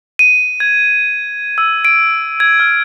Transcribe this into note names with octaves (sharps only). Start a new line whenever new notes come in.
D#7
G#6
E6
D7
G#6
F6